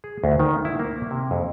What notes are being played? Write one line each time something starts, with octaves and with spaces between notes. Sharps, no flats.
G#4
D2
D#3
E4
A#3
C3
F2